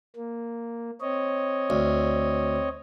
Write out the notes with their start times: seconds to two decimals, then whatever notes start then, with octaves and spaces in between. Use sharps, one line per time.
0.16 A#3
1.01 C4 C#5 D#5
1.70 D2